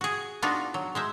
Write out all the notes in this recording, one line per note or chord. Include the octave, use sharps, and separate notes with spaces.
F#4 G#4
B3 D4 D#4 F4 F#4
F#3
G#3 C5 E5